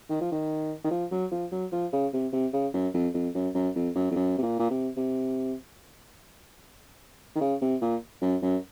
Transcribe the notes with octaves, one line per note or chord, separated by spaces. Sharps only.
D#3
F3
D#3
D#3
F3
F#3
F3
F#3
F3
C#3
C3
C3
C#3
F#2
F2
F2
F#2
F#2
F2
F#2
F2
F#2
C3
A#2
A#2
C3
C3
D#3
C#3
C3
A#2
F#2
F#2